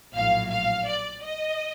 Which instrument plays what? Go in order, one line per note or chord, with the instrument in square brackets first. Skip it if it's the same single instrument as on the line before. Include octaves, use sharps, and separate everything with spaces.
[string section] A#1 A2 F#3 F5
F5
D5
D#5